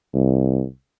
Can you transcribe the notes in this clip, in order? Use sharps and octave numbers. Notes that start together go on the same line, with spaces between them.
C2